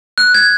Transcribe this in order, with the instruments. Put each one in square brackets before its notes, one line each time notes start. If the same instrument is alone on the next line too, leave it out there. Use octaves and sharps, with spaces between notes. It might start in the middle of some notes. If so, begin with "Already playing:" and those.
[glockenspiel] F#6
G#6